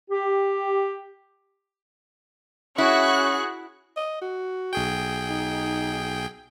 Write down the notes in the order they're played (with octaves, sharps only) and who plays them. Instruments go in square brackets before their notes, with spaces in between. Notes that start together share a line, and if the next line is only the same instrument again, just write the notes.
[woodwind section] G4
[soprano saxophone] C#4 [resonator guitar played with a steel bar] E4 [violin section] F#4 C#6 F#6 [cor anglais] G#4
[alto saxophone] D#5
F#4
[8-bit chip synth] B1 G#4 G5
[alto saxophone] D#4